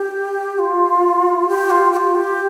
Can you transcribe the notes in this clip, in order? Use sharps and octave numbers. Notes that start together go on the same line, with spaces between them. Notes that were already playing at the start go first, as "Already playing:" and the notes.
Already playing: G4
F4
G4
F4
G4
F4
G4